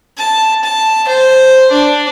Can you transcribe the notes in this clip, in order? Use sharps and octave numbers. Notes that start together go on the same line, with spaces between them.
A5
A5
C5
D4